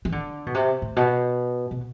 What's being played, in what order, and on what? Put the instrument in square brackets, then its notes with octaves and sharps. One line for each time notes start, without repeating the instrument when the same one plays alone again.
[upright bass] E3
D3
B2
C3
A2
B2
B2